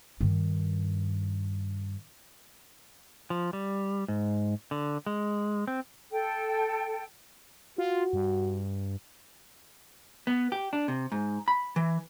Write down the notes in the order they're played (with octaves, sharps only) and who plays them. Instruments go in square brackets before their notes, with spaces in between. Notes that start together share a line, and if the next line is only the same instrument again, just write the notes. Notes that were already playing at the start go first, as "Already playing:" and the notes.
[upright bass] G2 D#3
[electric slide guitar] F3
G3
G#2
D3
G#3
C4
[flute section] A4 G5
[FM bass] F4 [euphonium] F#4
[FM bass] G2
[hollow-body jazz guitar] B3
G4
D4
C3
G#2
B5
E3